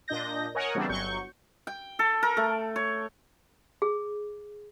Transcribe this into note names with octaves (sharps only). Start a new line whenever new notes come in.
A#2 D4 D#5 G6 A#6
A#4 C#5 D#5 F#5 G#5
C#3 E3 G3 B3 C4 D4
G1 F#3 C#6 G6
G5
A4
A#4
A3
C#5
G#4